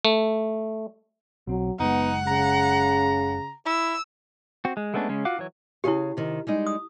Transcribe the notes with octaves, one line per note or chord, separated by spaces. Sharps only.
A3
B1 F#3 C4
F#1 G#3 B3 D#4 F#5
C#3 A#5
E4 E6
C4 F#4
G#3
G#3 A3 B3 C#4 D4
C#3 G#3 C#4
F4 F#4 F5 F#5 D6
E3 F#3 C#5
C#3 E4 G4 G#4 F5
C3 D#3
G3 G#3 D#4
D#6